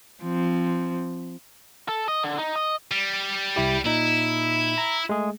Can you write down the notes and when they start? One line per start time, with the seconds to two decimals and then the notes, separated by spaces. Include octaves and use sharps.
0.23 F3 C4
1.88 A4
2.08 D#5
2.23 D3
2.38 D#4
2.56 D#5
2.91 G3
3.56 C2 E4 G4
3.85 A#2 D#4 E4
4.78 A#5
5.09 G#3 A3 G#4